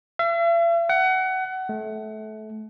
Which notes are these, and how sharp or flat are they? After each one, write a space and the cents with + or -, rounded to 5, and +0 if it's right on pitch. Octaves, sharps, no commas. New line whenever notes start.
E5 +45
F#5 +25
A3 -25